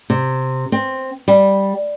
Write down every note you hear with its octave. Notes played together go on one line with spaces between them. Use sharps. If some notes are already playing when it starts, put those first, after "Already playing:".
C3
C4
G3